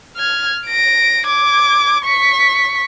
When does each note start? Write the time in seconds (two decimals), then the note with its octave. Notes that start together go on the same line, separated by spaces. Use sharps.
0.17 F6 G#6
0.67 A#6 D7
1.27 D6 G#6
2.05 C#6 B6